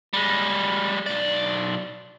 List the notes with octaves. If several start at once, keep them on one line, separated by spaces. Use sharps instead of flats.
G3 G#3
B1 D5